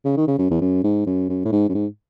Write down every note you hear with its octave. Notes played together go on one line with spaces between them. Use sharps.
C#3
D#3
C#3
F#2
E2
F#2
G#2
F#2
F#2
A2
G#2
F#2
G#2